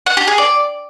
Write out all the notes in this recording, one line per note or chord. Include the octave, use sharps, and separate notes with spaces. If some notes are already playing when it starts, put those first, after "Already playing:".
F#5
G4
G#4
D5